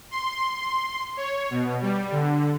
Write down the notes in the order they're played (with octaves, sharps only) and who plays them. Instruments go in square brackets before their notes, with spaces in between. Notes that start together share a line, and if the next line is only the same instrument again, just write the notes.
[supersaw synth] C6
C#5
B2
G3
D3